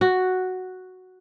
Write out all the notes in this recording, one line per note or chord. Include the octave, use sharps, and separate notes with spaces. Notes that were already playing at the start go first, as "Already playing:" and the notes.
F#4